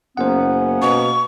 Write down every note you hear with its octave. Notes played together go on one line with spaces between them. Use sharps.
F#1 A#3 B3 C#4 C5 F#5
B2 C#6